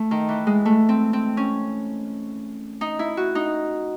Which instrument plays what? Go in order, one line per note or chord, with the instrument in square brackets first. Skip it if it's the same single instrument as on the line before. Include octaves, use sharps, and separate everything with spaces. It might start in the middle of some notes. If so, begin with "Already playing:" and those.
Already playing: [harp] A3
D#3
E3
G#3
A3
C4
C4
C#4
D#4
E4
F#4
D#4